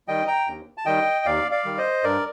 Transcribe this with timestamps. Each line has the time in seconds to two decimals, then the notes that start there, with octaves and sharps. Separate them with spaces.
0.08 D#3 G3 D#5 G5
0.27 G5 A#5
0.47 D#2
0.78 A5
0.86 D#3 G3 D#5 G5
1.25 D#2 D5 F5
1.51 D5 F5
1.65 D#3 G3
1.78 C5 D#5
2.04 G2 A#4 D5